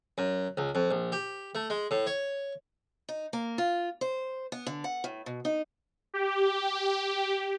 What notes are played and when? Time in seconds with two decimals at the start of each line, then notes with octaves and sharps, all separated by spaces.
0.18 F#2
0.57 C#2
0.75 F2
0.91 A#1
1.12 G4
1.55 A3
1.70 G#3
1.91 A2
2.07 C#5
3.09 D#4
3.33 A#3
3.58 F4
4.01 C5
4.52 B3
4.67 D3
4.84 F#5
5.04 A2
5.26 B2
5.45 D#4
6.14 G4